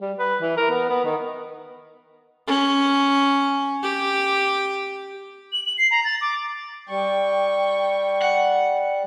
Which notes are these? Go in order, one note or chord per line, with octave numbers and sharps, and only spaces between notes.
G3
B4
E3
A#4
B3
B3
D#3
C#4
G4
F#7
F#7
C7
A#5
A6
D6
G3 G5 C#6
F#5